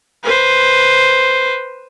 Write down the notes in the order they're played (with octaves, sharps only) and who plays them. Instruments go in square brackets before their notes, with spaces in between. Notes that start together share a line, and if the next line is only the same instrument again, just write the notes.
[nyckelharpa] B4 C5